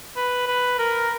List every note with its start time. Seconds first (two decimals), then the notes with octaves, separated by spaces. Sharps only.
0.16 B4
0.47 B4
0.78 A#4